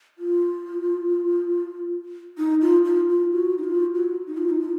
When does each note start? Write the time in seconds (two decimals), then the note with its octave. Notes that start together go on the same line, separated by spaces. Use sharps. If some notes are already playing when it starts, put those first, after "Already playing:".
0.18 F4
2.38 D#4
2.61 F4
2.85 F4
3.09 F4
3.32 F#4
3.58 D#4
3.64 F4
3.95 F#4
4.27 D#4
4.37 F4
4.50 D#4
4.60 F4